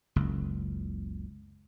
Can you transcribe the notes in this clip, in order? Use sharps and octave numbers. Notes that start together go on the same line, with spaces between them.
F#1 C#2